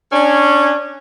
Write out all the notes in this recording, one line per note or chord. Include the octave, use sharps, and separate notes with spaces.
C#4 D4